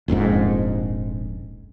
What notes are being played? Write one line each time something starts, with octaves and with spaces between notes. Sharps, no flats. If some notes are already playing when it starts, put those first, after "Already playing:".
D#1 A#1 F2 G#2